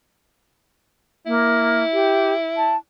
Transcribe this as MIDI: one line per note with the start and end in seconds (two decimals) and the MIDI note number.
1.26 1.83 58
1.26 2.74 64
1.93 2.33 67
2.57 2.76 81